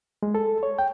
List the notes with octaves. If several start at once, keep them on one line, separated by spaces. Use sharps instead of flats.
G#3
A4
C#5
G5